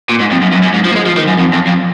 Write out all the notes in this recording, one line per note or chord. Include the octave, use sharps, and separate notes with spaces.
A#2
G#2
F2
F#2
F#2
F#2
G#2
F3
A#3
G#3
F3
D#3
F#2
F2
F2
F2